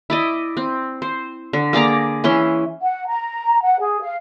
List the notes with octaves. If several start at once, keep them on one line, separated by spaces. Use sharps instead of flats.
E4 D5 D#5
C4
C5
D3
A#3 G#4 D5 A#5
E3 C#4 E4 C6
F#5
A#5
F#5
G#4
F5